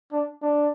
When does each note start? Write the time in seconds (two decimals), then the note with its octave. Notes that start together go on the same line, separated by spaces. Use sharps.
0.12 D4
0.42 D4